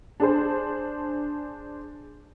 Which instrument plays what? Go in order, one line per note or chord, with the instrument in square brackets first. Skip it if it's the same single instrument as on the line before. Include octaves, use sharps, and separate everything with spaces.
[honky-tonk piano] D4 G#4 C5